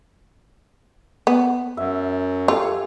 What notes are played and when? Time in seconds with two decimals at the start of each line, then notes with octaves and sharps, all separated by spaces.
1.27 B3
1.77 F#2 E5
2.48 F4 G4 A4 F5
2.63 G#5